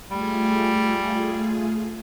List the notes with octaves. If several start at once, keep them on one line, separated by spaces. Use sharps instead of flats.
G3 A3 F4 G#4